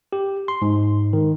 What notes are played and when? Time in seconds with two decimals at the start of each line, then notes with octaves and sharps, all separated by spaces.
0.13 G4
0.48 C6
0.62 G#2
1.13 D#3